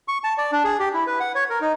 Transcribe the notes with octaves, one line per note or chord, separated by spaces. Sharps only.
C#6
A5
D5
D4
G#4
G4
E4
B4
F#5
C#5
A#4
D#4